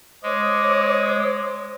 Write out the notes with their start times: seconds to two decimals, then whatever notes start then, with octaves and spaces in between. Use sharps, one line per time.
0.23 G#3 C5 C#5 D6 D#6